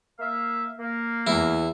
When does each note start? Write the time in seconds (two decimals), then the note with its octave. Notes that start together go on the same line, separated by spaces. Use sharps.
0.19 A#3 E5 F5
0.79 A#3
1.27 E2 E4